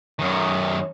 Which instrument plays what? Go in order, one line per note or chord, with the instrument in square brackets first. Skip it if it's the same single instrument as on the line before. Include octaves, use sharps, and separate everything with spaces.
[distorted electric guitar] F#2 D#3